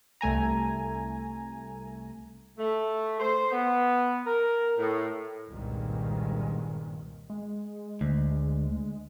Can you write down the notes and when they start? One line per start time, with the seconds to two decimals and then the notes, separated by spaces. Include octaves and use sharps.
0.21 C2 A3 G#5 A#5
2.58 A3
3.20 C5
3.52 B3
4.26 A#4
4.78 A2
5.48 F#1 C2 G2 A#2 D#3 G#3
7.30 G#3
8.01 D2